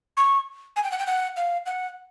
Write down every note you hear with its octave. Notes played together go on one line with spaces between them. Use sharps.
C#6
G#5
G5
F#5
G5
F#5
F5
F#5